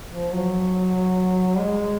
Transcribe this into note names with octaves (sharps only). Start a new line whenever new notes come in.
F3
F#3
G#3